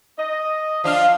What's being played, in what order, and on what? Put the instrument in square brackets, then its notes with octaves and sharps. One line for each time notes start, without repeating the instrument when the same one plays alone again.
[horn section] D#5
[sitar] F3 D4 F4 [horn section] F5